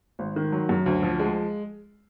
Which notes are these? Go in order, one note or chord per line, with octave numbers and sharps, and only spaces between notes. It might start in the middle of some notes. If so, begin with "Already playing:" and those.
G#1
D#3
F#3
F#2
D2
F3
G#3